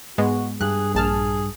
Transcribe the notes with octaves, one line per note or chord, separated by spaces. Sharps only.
G#2 G#3 B3 F#4
G2 G#4 F#6
A#1 G#4 A5 F6